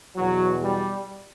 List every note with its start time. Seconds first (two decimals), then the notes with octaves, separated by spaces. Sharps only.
0.17 E2 B2 F#3
0.63 G3